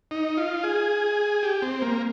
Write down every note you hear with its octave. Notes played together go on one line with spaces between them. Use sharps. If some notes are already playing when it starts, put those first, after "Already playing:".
D#4
F4
G#4
G4
C4
A#3